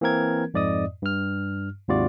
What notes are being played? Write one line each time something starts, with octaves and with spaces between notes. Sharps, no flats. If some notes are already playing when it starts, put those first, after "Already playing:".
E3 A#3 C4 A#4 G#6
F2 G#2 D5 D#5 D#6
G2 F6
D#2 G#2 C3 F4 F#4 D5